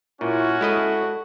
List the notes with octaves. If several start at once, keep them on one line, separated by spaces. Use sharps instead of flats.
A#2 C#4 E4 F#4
G#3 E4 A4 D#5